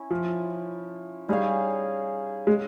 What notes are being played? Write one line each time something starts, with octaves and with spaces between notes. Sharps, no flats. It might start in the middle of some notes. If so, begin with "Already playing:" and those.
Already playing: C#4 E4
F3
G3 D#4 G#4 C#5 F5
G#3